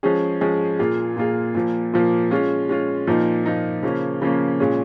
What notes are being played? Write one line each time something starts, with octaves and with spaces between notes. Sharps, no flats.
F3 G#3 C#4 G#4
F3 G#3 C#4 G#4
A#2 A#3 F4 G#4
A#2 A#3 F4 G#4
A#2 F3 A#3
A#2 F3 A#3
G#3 C#4 F4
G#3 C#4 F4
A#2 F3 A#3 D#4
A#2 F3 A#3 D#4
C#3 F3 A#3 C#4
C#3 F3 A#3 C#4
A#2 G#3 C#4 G#4